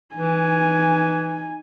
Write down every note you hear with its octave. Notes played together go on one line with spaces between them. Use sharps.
E3 D#4 G#5